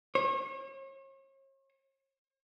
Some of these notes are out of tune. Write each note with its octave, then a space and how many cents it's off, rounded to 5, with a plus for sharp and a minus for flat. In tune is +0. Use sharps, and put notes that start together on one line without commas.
C#5 -40